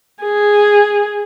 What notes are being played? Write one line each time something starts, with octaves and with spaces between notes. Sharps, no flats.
G#4